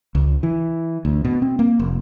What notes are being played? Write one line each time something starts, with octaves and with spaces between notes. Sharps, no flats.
C#2
E3
D2
B2
C4
A#3
F1